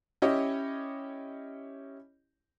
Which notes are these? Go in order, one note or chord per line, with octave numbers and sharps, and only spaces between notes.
C#4 E4 G4 C#5 D#5